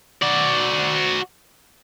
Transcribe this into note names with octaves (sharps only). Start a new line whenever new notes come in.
F#4 D5